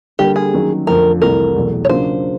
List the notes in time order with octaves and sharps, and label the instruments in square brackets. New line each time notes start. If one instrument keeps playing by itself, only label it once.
[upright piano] D3 G3 A#3 [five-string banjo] G4
[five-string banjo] G#4
[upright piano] D#3 F#3 A#3 C#4
[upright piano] F2 D3 F3 A3 C4 [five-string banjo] A#4
[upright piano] C2 C3 E3 A3 [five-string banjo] A#4
[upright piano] E2 B2 F#3 A3
[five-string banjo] C#5
[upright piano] C#3 F#3 A#3 D4 F4 [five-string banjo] C5